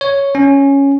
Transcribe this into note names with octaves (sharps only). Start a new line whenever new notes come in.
C#5
C#4